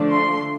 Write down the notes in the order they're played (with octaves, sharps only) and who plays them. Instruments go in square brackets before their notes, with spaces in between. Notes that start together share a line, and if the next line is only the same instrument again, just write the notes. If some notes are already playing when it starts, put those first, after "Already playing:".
Already playing: [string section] D3 F3 A3 D4
C6